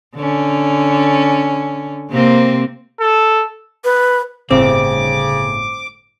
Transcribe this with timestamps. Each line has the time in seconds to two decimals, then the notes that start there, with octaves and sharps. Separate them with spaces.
0.16 D3 C#4
2.10 C3 A#3 C4
3.00 A4
3.84 B4
4.51 G1 A2 C#3 C4 D6